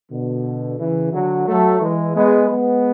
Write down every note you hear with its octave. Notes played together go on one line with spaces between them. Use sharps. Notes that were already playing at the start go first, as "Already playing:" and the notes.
B2 D3
C#3 E3
D3 F#3
F#3 A3
E3 G#3
G#3 B3
G#3 B3